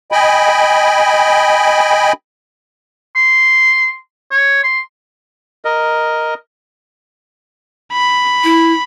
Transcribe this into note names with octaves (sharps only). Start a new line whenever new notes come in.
D#5 G5 G#5 B5
C6
C#5
C6
A#4 D#5
B5
E4